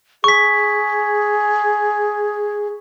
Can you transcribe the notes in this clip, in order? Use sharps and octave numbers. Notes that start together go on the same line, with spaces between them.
G#4 C#6 B6